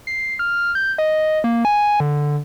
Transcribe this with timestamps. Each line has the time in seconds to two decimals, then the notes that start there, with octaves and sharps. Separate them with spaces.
0.07 C7
0.39 F6
0.75 G6
0.98 D#5
1.44 A#3
1.65 G#5
2.00 D3